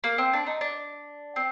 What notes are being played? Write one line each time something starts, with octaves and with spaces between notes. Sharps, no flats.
A#3
C4
D4
D#4
D4
C4